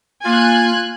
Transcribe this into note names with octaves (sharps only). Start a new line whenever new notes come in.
A#3 F4 G#5 F#6